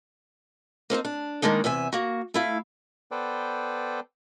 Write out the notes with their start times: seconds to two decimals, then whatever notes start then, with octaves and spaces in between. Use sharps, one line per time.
0.90 A#3 C4 C#4 D#4
1.05 D4
1.42 D#3 G#3 A#3 D4 D#4
1.64 E2 C3 E5 G#5
1.93 A#3 F#4
2.34 A3 E4 F5
3.11 B3 A4 B4 C5 D5 G5